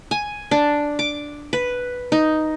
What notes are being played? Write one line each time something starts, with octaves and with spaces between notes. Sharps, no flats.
G#5
D4
D6
B4
D#4